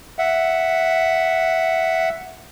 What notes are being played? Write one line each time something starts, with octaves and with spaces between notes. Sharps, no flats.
E5 F#5